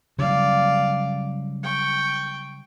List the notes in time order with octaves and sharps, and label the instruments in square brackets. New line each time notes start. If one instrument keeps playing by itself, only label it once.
[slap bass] C#3 F#3 G3 [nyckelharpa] D5 F5
[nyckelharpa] G5 C#6